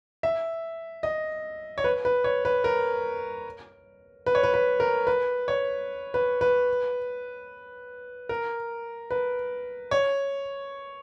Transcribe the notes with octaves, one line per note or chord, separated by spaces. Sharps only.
E5
D#5
C#5
B4
B4
C#5
B4
A#4
B4
C#5
B4
B4
A#4
B4
C#5
B4
B4
A#4
B4
C#5